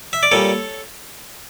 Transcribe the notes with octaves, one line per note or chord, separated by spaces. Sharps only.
E5
D5
A#2 G3 A4 C#5